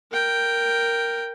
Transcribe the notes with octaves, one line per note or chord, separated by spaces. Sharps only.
A#4 G5